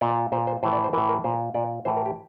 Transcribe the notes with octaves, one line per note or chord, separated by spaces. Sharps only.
A#2 D5
A#2 C5
C5
A2 E3 C5
D5
C5
A2 E3 A#4
A#4
A#2 C5
A#2 D5
A2 E3 C5
A#4
G4